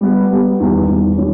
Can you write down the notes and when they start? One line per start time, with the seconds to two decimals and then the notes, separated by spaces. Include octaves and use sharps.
0.01 G3 B3 G4
0.30 G3 B3 G4
0.60 E2 D#3 G3
0.88 E2 D#3 G3
1.18 D#3 G3 C#4